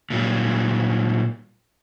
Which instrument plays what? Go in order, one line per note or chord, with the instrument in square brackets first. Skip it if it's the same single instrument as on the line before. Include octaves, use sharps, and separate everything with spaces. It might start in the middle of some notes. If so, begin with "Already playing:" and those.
[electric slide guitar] A#2 F#3 G3